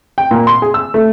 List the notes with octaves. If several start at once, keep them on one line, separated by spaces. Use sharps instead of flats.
G5
A#2
C6
G#4
E6
A3